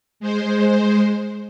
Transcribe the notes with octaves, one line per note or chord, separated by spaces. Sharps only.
G#3 C5